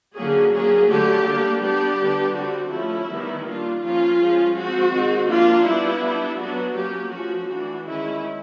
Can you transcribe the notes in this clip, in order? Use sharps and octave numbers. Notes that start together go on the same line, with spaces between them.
D3 F#3 A#3 C#4 G#4
F#3 A#3 C#4 G#4
D3 F#3 A3 G4
G3 A#3 D4
G3 B3 D4 G4
D3 G3 B3 D4
D3 G3 C4 F#4
F3 A3 C#4 E4
D#3 G3 B3
G3 A#3 D4 F4
F3 A#3 C#4 F4
F3 G#3 C#4
F3 G#3 C4 F#4
D#3 G#3 C4
F3 A#3 D4 F4
G3 B3 D4 E4
G3 B3 D4
F#3 B3 D4 F#4
F#3 A#3 C#4 G4
F3 A3 C#4 F#4
E3 A3 D4 F#4
D#3 G#3 C#4 E4